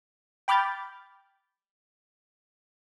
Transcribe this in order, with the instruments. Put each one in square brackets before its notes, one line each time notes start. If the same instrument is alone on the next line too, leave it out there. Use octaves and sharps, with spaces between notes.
[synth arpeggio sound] G5 B5 D6 F6 G6 A6